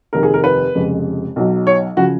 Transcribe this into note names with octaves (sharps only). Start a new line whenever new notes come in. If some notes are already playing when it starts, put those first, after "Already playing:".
F1 D#2 D#3 A#4
G#4
A#4
B4
F1 F2 C#3 G#3
B1 B2 F#3
C#5
C#3 F3 F#4